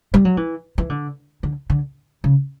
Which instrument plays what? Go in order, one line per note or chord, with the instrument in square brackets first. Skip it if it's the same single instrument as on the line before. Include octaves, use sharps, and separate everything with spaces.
[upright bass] G3
F#3
E3
E3
D3
D3
D3
C#3